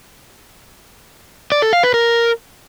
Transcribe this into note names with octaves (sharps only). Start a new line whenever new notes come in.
D5
A4
F5
B4
A#4